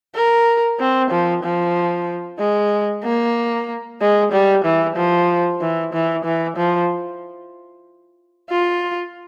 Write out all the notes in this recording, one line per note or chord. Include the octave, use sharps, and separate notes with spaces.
A#4
C4
F3
F3
G#3
A#3
G#3
G3
E3
F3
E3
E3
E3
F3
F4